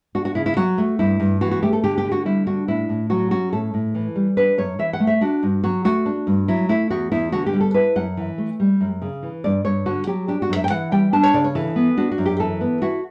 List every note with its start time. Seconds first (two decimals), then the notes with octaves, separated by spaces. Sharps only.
0.15 D4 F#4
0.25 F#4
0.35 C#3 E4
0.46 E4
0.56 F#3 F#4
0.78 A3
0.99 G2 E4
1.20 G2
1.41 E3 F#4
1.51 F#4
1.63 A3 G4
1.73 A4
1.84 D3 G4
1.98 G4
2.05 D3
2.12 F#4
2.25 G3 E4
2.47 D4 F#4
2.68 A2 E4
2.89 A2
3.10 F#3 F#4
3.31 C#4 F#4
3.52 A2 A4
3.74 A2
3.95 E3
4.16 G3
4.37 D4 B4
4.58 F#2 C#5
4.79 E3 E5
4.93 F#5
5.00 A3
5.07 E5
5.21 D4 F#4
5.43 G2
5.64 F#3 F#4
5.84 A3 F#4
6.06 D4
6.27 G2
6.48 F#3 E4
6.69 A3 E4
6.90 E2 F#4
7.12 E2 E4
7.32 D3 F#4
7.46 G4
7.53 G3
7.60 A4
7.74 E4 B4
7.96 F#2 F#5
8.17 E3
8.38 A3
8.60 G3
8.81 F#2
9.02 C#3
9.23 E3
9.44 G2 D5
9.65 G2 C#5
9.86 D3 F#4
10.07 F#3 G4
10.28 D4 G4
10.42 F#4
10.49 F#2
10.56 E5
10.64 G5
10.70 E3 F#5
10.91 G3 G5
11.13 D4 A5
11.23 C#5
11.34 C#3 D5
11.44 C#5
11.55 E3 A4
11.76 B3
11.97 D4 F#4
12.11 F#4
12.18 F#2
12.26 G4
12.40 E3 A4
12.61 B3
12.81 E4 F#4